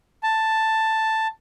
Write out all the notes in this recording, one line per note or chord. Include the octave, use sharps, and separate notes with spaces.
A5